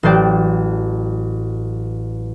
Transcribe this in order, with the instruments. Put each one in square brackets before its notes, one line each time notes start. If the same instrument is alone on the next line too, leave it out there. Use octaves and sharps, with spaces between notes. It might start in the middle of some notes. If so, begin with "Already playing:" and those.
[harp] A1 F#3 C5 D5 G5